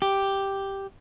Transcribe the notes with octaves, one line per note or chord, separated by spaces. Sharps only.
G4